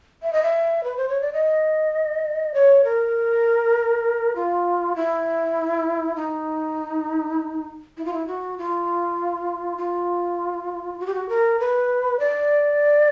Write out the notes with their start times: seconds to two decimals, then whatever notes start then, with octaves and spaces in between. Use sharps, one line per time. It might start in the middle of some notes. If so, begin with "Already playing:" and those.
0.23 E5
0.33 D#5
0.43 E5
0.84 B4
0.97 C5
1.09 C#5
1.21 D5
1.33 D#5
2.54 C#5
2.84 A#4
4.35 F4
4.96 E4
6.16 D#4
7.97 E4
8.05 F4
8.13 E4
8.27 F#4
8.58 F4
9.78 F4
11.00 F#4
11.06 G4
11.15 F#4
11.29 A#4
11.60 B4
12.19 D5